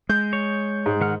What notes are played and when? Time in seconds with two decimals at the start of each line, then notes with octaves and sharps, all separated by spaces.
0.09 G#3 G6
0.33 C#5
0.86 G#2
1.01 D#3 F#5 F6